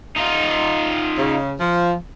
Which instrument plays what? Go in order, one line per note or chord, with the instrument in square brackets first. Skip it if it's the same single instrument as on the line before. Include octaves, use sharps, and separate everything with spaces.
[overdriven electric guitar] D#4 F4
[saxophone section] C#3
F3